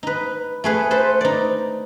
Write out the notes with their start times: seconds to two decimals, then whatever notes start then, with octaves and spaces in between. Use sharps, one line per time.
0.03 D#4 B4
0.64 A3 G#4 B4
0.91 A4 B4 C5
1.21 D#4 D5